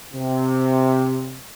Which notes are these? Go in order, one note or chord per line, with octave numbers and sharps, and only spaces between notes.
C3